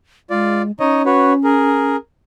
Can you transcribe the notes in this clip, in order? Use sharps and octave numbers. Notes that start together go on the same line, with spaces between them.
G#3 F4 D5
C#4 D#4 C#5 D#5
F#4 B4 C#5
G#4 A#4